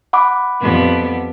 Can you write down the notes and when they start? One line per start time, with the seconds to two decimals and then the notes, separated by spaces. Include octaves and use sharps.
0.13 F#5 B5 D6
0.61 F2 G3 B3